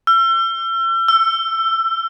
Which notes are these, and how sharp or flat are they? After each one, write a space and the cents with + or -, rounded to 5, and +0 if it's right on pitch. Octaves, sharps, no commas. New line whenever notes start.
E6 +40
E6 +20